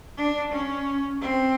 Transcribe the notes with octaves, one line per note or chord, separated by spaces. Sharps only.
D4
C#4
C4